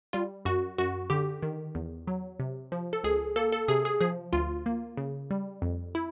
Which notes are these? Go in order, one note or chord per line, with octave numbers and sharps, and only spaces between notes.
G3 F4
F#2 F#4
F#2 F#4
D3 G4
D#3
E2
F#3
C3
F3
A4
C#2 G#4
A#3 A4
A4
C3 G#4
G#4
F3 G#4
D2 F4
A#3
C#3
G3
F2
E4